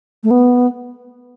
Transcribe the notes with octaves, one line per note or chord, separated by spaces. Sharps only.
A3
B3